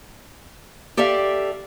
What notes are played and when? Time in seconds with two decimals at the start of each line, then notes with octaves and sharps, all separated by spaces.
0.97 G4 A4 D5 E5 F5